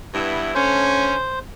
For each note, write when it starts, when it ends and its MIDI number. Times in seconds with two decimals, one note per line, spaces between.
0.14 0.52 43
0.14 0.52 59
0.14 0.52 64
0.55 1.14 50
0.55 1.14 57
0.55 1.14 61
0.55 1.39 72